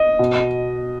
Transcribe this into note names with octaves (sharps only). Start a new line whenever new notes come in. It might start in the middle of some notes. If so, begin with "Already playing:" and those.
Already playing: D#5
B2